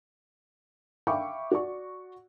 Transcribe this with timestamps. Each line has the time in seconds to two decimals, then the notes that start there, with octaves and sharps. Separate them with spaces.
1.07 E5 F5 G5 B5 C#6 D6
1.51 F#4 D5 C#6